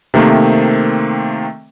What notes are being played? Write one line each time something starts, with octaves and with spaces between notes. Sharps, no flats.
C3 D#3 A3 A#3 C4